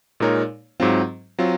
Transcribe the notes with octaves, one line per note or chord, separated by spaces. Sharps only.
A#2 G#3 D#4 A#4 C#5
G#2 F#3 C4 F4
F#3 C4 F4